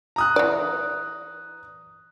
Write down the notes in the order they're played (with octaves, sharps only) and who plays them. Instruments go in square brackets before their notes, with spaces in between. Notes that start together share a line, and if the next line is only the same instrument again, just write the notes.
[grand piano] A#5 D#6 F#6
[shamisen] E3 D5